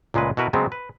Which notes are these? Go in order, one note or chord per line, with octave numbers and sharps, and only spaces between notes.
C#2 A#2 G#3 A3 B4
B2 E4 F#4 A#4 B4
C#3 F#3 G#3 B3 C4
B4